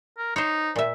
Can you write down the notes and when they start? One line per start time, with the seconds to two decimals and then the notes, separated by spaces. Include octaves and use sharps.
0.18 A#4
0.36 D#4 C5 C#5
0.76 A#2 E5